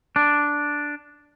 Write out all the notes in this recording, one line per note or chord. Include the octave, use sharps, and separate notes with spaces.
D4